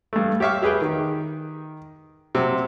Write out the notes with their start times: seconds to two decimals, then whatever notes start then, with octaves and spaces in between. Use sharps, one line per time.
0.13 G2 A3
0.40 G4 C#5 E5 F5 C#6
0.63 G4 G#4 B4 G5
0.82 D#3
2.35 C3 F#3